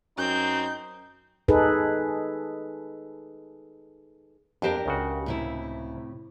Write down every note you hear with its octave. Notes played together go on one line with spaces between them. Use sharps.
F#2 C4 D#4 G6
D#4 G#4 A4 B4
F2 D4 G4 A#4 C5 G5
C#2 C#3 F#4
A2 C3 E4